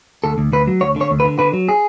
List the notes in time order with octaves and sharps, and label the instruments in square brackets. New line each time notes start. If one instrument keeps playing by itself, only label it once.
[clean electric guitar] D2 A4
D2
D2 B4
F#3
D2 C#5
D3 C#5
D2
B4
D3
D3 B4
F#3
G#4